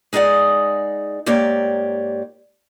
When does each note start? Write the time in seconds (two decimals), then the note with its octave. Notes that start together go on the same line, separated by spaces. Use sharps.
0.13 G#3 D#4 G#4 D5 F#5
1.26 G#2 A#3 G4 C#5 D5